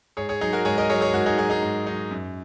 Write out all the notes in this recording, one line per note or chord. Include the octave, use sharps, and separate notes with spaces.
G#2 G#4 C#5
G#4 C#5
F#3 D#4 G#4
F#4 A#4
G#2 G#4 C#5
A#4 D#5
F#3 G#4 C#5
G#4 C#5
G#2 F#4 A#4
D#4 G#4
F#3 D#4 G#4
D#4 G#4
G#2
F#3 D#4
F#2